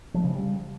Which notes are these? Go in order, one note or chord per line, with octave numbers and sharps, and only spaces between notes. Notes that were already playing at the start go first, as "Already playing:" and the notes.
F3
C#3
G3